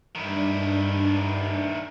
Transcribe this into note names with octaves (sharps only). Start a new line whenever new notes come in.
G2 D#3 D4 E4